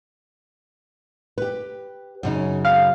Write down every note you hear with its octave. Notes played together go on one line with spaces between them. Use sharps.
G4 B4
F#2 C#3 D#4
F5